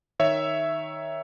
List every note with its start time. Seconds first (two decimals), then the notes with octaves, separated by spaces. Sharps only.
0.19 D#3 C#5 E5